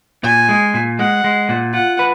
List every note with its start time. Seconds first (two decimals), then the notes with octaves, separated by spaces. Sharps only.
0.23 A#2 G#5
0.49 G#3
0.74 A#2
0.99 G#3 F#5
1.24 G#3
1.49 A#2
1.74 F4 F#5
1.99 B4